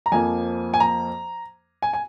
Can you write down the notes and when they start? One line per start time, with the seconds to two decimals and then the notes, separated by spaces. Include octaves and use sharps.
0.06 A#5
0.12 F2 F3 A#3 G#5
0.74 G#5
0.80 A#5
1.82 G#5
1.93 G#5